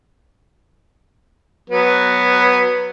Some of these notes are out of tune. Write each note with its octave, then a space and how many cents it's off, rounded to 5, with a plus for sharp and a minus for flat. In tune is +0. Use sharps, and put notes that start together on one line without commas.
F#3 +0 B3 +0